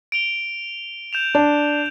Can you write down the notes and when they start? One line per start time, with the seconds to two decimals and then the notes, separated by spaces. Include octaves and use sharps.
0.12 D7 F7 G7
1.13 G6 E7 F7
1.35 D4